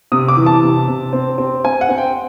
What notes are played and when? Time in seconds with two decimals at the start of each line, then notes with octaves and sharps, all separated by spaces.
0.12 C3 D#6
0.28 D6
0.37 E3
0.46 A5
0.63 C3
0.88 C3
1.13 C4
1.38 C4
1.65 C4 G#5
1.81 F#5
1.89 C4
1.98 G5